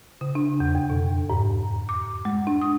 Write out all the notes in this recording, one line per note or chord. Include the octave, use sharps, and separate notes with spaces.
C#3
D4
E2
F2
B2
G#2
D6
G#3
D4
D#6